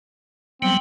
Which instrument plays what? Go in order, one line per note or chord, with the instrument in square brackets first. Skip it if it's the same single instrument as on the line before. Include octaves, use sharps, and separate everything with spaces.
[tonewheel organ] F#3 G3 B3 [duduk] C4